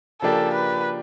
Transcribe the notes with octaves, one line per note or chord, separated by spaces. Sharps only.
C#3 F3 A#3 D4 G4 A4
B4